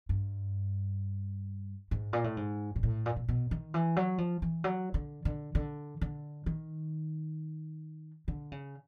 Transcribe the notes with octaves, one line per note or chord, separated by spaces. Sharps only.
G2
G#2
A#2
A2
G#2
A#2
A2
A#2
A#2
B2
D#3
E3
F#3
F3
E3
F#3
D3
D3
D3
D3
D#3
D3
C#3